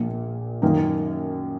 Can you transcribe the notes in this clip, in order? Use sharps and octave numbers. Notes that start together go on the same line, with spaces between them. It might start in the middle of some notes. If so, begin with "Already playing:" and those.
Already playing: A#1 A#2 A#3
F#2 D#3 A#3 D#4